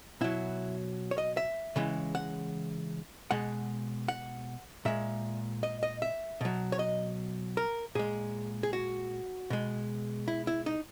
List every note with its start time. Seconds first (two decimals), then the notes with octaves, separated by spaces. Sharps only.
0.21 B2 F#3 E4
1.11 C#5
1.18 D#5
1.37 E5
1.76 C#3 E3 G#3
2.15 F#5
3.31 B2 G#3 F#5
4.08 F#5
4.85 A#2 G#3 E5
5.63 D#5
5.83 D#5
6.02 E5
6.41 B2 F#3
6.72 C#5
6.79 D#5
7.57 A#4
7.95 A#2 G#3 G#4
8.63 G#4
8.73 F#4
9.50 B2 G#3
10.28 E4
10.47 E4
10.66 D#4